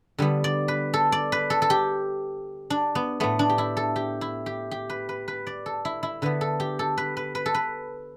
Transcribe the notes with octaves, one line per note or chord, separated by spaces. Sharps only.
D3 G3 B3
D5
B4
A4
D5
B4
A4
A4
G4
D4
B3
A2 A3 B3
D4
G4
E4
A4
G4
E4
G4
G4
B4
B4
B4
D5
A4
E4
E4
D3 B3 B4
A4
G4
A4
B4
B4
B4
A4
B4